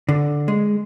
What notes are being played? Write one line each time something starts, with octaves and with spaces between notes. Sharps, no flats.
D3
G#3